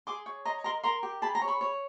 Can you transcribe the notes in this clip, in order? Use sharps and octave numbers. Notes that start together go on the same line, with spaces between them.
G#4 C6 D6
C#5
D#5 A#5 C6
A#4 A#5 C6
A#4 A#5 C6
G4
G#4 A5 B5
A#5 C6
C#5
B5 C#6
C#5